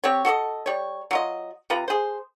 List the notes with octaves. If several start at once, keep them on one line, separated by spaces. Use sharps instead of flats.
C4 G4 C#5
F#4 A4 D5 D#5
G3 C#5
F#3 F4 D#5
C3 F4 B4 A#5
G#4 C5